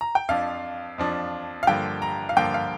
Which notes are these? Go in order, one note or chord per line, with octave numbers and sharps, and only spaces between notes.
A#5
G5
F2 F3 D4 F5
F2 F3 D4
F5
G2 D3 F3 A#3 G5
A#5
F5
G2 D3 F3 A#3 G5
F5